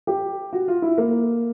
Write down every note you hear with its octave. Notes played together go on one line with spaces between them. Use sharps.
G4
F#4
F4
E4
A#3